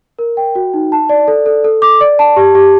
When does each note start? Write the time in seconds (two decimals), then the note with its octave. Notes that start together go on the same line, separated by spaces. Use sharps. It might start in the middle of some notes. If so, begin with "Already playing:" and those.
0.19 A#4
0.37 G5
0.55 F#4
0.74 D#4
0.92 A5
1.09 D5
1.28 A4
1.46 A4
1.64 A4
1.82 D6
2.01 D5
2.19 A5
2.36 G4
2.55 G4